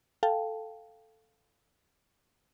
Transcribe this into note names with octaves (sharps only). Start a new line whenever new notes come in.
A4 F5 G5 A5